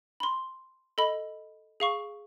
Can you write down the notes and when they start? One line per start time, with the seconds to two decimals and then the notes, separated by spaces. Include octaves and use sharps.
0.20 B5 C6
0.98 A4 D#5 B5
1.80 G#4 F5 C#6